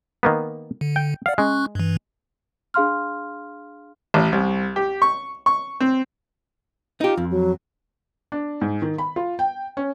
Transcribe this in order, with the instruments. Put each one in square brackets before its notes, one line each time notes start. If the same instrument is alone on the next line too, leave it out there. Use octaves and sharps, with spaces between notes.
[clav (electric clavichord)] D#3 A#3 B3
[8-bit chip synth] D3
[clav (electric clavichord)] G5
[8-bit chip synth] D5 F#5 [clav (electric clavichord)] F5
[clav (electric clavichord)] G#3 [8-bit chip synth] C#4 C#6 F#6
[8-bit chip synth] G2 E3
[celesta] D4 G#4 F5 C6 F6
[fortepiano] A1
C2
G4
C#6
C#6
C4
[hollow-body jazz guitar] D#4 G4 [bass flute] F4
[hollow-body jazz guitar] F2
[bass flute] F#3
[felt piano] D4
G#2
D#3
B5
F4
G5
C#4